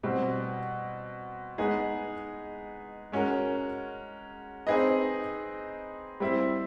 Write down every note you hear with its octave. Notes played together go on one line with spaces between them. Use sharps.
B2 G3 C4
G#3 B3 D#4 G#4
G#3 C#4 F#4 A#4
C4 D#4 G#4 B4 D#5
G3 C4 E4